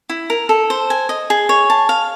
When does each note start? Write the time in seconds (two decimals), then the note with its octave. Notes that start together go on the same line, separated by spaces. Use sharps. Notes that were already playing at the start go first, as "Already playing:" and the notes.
0.09 E4
0.30 A#4
0.49 A4
0.70 C5
0.90 G#5
1.09 D#5
1.30 G#4
1.49 C#5
1.70 A5
1.89 F5